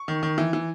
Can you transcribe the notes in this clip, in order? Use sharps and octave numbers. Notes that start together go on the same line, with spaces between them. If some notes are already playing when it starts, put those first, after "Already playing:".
Already playing: C#6
D#3
D#3
E3
E3